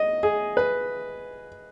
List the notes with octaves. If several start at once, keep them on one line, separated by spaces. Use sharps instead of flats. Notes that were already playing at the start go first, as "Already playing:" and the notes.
Already playing: D#5
G#4
B4